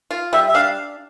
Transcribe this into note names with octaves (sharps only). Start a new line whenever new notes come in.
F4
G3 E5
E5
D4 F5